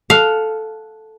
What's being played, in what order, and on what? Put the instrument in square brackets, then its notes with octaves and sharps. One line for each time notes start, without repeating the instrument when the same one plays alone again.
[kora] A4 F#5 [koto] F5